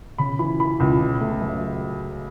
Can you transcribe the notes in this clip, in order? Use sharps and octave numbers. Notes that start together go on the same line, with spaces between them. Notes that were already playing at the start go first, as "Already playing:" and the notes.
C#3 B5
E3 B5
E3 B5
C#2
C#3
A3
F#2